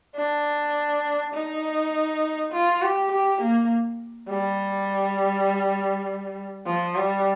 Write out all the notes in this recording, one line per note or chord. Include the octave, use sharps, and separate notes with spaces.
D4
D#4
F4
G4
G4
A#3
G3
F3
G3